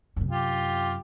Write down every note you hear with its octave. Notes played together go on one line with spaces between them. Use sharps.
F#2 C3
F4 G4